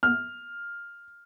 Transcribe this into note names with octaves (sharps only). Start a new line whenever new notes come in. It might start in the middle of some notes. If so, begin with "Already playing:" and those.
F6